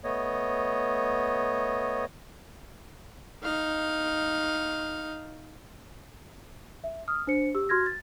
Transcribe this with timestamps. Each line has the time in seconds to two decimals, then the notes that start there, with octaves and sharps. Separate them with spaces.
0.04 A3 B3 C#5 D#5
3.43 D#4 F5
6.84 E5
7.08 D#6 F6
7.27 D4 C5 C#7
7.55 G4 E6
7.69 F#4 C6 F6 G#6 A#6
7.86 A6